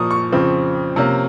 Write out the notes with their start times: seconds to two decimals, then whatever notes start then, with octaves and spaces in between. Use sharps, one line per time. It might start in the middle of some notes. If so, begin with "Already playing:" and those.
Already playing: A#2 F3 A#3 C#6 D#6
0.11 C#6
0.32 F2 C#3 F3 C4
0.96 C3 F3 A#3 C#4